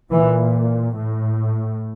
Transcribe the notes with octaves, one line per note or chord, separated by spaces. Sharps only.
A#2 E3
A2